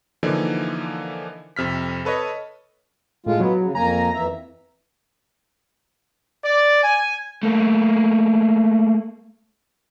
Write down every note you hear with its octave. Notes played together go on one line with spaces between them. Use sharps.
D3 E3 F3 A#3 D#4
F2 C3 F6 B6
A4 B4 C#5 D#5
A2 G#3 F4
F#3 B3
C#3
F2 A#3 G#5 A#5
F2 E3 E5
D5
G#5
A3 A#3